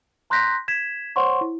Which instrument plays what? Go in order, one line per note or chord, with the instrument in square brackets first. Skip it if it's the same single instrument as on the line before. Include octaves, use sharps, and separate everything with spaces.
[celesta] A#5 C6 F#6 G6 A#6 B6
G#6 B6 E7
C5 C#5 F#5 C6 C#6
E4